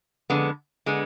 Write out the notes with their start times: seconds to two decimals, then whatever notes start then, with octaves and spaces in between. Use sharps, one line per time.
0.30 F2 D3 G#3 B3
0.86 D3 G#3 B3